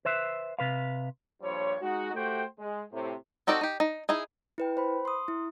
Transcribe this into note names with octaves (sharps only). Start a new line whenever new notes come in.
B4 C5 E5
C3 B4 F5
A#1 G2 F3 G3 C5 C#5
G#3 D#4 F#4
A3 F#4 G4 C5 G5
G#3
A2 C3
C4 D#4 F#4 A4 D5
D#4 G4
D#4
D#4 E4 G#4
E4 B4 G5
C5 B5
C6 D#6
E4